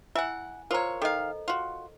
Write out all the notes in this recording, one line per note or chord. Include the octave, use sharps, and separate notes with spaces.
E4 E5 F#5 G#5
F4 A#4 C5 C#5 A#5
D#3 A4 D#5 F5
F4 F#4